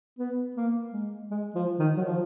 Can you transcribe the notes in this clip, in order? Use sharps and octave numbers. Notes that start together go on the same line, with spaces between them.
B3
A#3
G#3
G#3
F3
D#3
F#3
F3